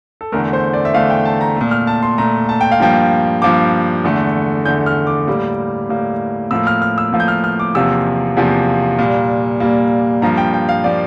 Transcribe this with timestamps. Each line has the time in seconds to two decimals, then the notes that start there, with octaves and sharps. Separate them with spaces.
0.21 A4
0.32 E2 D3 A3 A#4
0.53 C5
0.73 D5
0.85 E5
0.94 E2 D3 A3 F5
1.10 G5
1.25 A5
1.41 A#5
1.56 A#2 A3
1.71 F6
1.87 A5
2.03 C6
2.18 A#2 A3 A#5
2.49 A5
2.61 G5
2.72 F5
2.80 G2 F3 A#3 G5
3.42 G2 F3 A#3 D6
4.04 E2 D3 A3
4.65 E2 D3 A3 G6
4.86 F6
5.07 D6
5.27 A2 G3 A#3
5.89 A2 G3 A#3
6.51 A2 F3 A#3 E6
6.67 F6
6.82 F6
6.98 E6
7.12 A2 F3 A#3
7.20 G6
7.28 F6
7.44 F6
7.60 D6
7.75 E2 C3 F3 A#3 E6
8.37 E2 C3 F3 A#3
8.98 A#2 G3 A#3
9.60 A#2 G3 A#3
10.22 G2 F3 A#3 A#5
10.37 G5
10.53 G5
10.69 F5
10.84 F3 A#3 D5